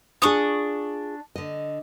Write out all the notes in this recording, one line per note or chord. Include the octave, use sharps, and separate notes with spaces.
D4 F4 G#4 C#6 D#6
D3 D#5